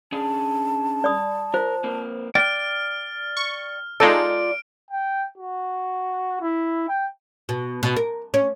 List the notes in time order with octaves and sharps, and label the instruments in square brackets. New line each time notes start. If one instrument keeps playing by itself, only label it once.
[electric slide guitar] C#4 D4 G#4 [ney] A5
[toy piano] D5 B5 D#6
[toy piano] F4 C5 [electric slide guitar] A#4
[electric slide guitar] A#3 C4
[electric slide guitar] D5 G5 [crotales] F6
[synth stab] C#6
[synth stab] G#3 D#4 A4 [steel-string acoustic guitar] F4 D5 [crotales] D7
[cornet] G5
F#4
E4
G5
[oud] B2
B2
A#4
C#4